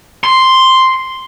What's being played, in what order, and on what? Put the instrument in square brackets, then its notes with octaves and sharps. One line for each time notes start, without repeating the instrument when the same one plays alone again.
[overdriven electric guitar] C6